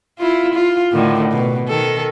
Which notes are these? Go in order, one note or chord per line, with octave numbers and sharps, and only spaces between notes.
E4 F4
F4
A2 D3 D#3
B2
D#3 A4